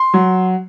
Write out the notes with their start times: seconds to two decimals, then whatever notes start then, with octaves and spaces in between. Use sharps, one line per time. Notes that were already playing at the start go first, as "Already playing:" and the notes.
Already playing: C6
0.14 F#3